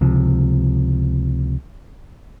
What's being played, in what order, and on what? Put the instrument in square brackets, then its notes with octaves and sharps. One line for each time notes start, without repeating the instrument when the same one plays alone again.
[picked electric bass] C#2 C3 F3